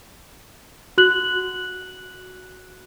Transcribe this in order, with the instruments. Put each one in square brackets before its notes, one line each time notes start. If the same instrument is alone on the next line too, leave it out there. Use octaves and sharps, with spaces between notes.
[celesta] F#4 F#6 F#7